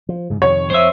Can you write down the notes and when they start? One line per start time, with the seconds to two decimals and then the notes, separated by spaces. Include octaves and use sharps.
0.09 F3
0.30 G#2 C#3
0.42 F2 C3 D#3 C#5
0.70 F2 C5 E5